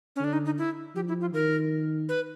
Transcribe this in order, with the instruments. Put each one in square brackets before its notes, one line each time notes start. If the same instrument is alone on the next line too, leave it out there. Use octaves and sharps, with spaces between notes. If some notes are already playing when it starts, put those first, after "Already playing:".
[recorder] C#4
[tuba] D3 [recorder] D4
[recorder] D#4
D#4
E4
[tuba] F3 [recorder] G4
[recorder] E4
F4
[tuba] D#3 [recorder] A#4
[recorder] B4